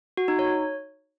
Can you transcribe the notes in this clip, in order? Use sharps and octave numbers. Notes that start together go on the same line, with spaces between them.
F#4
D#4
C#5